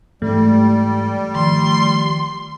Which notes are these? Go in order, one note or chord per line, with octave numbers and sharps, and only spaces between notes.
G#2 E3 G3 A3
D#3 F3 C6